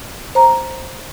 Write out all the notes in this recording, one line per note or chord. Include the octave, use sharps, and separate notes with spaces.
C5 A#5